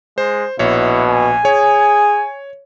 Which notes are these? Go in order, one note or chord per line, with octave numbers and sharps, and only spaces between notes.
G#3 C5
A#1 B2 E4 C#5
G#5
G#4 C#5